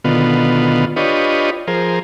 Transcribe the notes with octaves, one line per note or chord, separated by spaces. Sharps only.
B2 D3 D#3 B3 F4
D4 F4 G4 B4 C#5 D#5
F3 G#4 A#4 C5